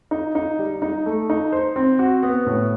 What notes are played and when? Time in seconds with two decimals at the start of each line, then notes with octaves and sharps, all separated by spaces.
0.11 D#4
0.35 D#4
0.59 G3
0.82 D#4
1.06 A3
1.30 D#4
1.52 C5
1.76 C4
1.99 F#4
2.23 B3
2.46 A2